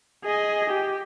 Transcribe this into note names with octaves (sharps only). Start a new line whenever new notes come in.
G#4 D#5
G4